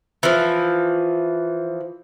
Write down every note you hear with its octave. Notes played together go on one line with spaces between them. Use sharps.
E3 F3